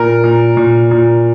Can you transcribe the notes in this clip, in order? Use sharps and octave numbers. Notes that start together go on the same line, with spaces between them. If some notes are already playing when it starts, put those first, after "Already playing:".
Already playing: A#2 A#4
A#2
A#2
A#2